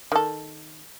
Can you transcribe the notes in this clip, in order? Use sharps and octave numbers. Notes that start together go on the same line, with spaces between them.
D#3 A4